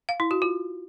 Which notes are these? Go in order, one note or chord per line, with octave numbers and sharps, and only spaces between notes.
F5
E4
F#4
F4